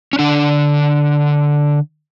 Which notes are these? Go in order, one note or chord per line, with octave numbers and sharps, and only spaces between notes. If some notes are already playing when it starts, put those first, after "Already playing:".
C#4
D3 D4